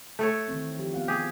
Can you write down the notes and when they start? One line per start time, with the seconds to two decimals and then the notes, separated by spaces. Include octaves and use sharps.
0.19 A3 A4 C#5
0.48 D#3 E3 C4
0.79 F3 G4
0.94 B3 F5 F#5
1.08 G4 G#4